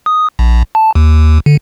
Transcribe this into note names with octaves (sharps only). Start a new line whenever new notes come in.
D#6
A#1
A5
D#2
D3